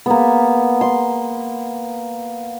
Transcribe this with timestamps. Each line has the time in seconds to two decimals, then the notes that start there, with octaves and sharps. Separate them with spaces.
0.06 A#3 B3
0.81 C6